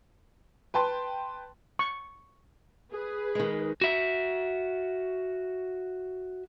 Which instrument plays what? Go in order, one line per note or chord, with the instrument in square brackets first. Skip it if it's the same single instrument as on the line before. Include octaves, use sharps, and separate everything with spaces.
[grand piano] B4 G5 A5 C6
[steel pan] C#6
[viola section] G#4 B4
[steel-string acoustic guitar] D#3 G#3
[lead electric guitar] F#4 E5